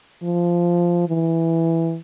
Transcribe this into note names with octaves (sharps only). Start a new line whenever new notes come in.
F3
E3